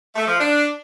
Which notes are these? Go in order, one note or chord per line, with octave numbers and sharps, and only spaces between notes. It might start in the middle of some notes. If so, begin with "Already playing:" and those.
A3
F3
D4